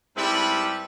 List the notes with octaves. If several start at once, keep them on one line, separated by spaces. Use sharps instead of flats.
G#2 G3 C4 E4 A4 B4